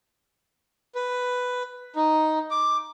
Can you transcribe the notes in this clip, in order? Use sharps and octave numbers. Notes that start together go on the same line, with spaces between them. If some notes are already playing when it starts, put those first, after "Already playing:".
B4
D#4
D6